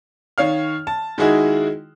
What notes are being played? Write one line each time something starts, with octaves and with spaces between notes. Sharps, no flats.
D#3 C#5 F5 F6
A5
D#3 G#3 D#4 E4 F#4 G#4